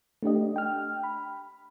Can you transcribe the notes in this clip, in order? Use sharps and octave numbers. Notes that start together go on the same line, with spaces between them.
A3 D4 G4 D#5
G5 F6
B5